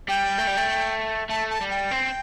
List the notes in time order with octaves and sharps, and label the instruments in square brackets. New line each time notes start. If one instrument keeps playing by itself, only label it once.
[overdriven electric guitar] G3 [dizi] G5
[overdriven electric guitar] A3
G3
A3
[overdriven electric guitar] A3 [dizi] A5
[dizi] A5
[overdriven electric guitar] G3
[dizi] G5
[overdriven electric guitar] C4